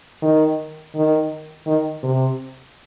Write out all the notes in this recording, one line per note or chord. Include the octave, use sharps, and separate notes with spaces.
D#3
D#3
D#3
C3